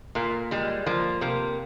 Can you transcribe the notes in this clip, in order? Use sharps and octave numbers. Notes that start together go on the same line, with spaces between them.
A#2 A#3
G3 G#3
F3 A#3
C3 A#3